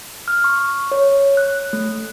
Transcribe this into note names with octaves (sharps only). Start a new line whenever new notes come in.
F6
C#6
C#5
F#6
A3